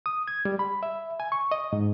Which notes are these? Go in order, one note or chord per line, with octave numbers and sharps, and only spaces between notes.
D#6
G#6
G3
B5
E5
G#5
C#6
D#5
G#2